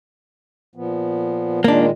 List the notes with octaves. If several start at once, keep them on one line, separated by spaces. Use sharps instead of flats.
A#2 F3 B3
A#2 D#3 G#3 A#3 D4